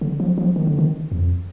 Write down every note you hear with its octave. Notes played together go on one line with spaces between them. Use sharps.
D3
F3
F3
D#3
D3
D#3
F2